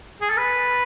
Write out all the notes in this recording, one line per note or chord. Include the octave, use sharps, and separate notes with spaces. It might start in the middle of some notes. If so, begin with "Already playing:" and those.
G#4
A4
B4